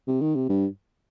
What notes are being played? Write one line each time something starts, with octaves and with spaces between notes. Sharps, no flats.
C3
D#3
C3
G2